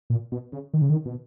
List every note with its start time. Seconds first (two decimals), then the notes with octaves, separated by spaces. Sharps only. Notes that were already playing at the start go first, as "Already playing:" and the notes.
0.10 A#2
0.32 B2
0.52 C#3
0.74 D#3
0.82 C#3
0.90 D#3
1.05 B2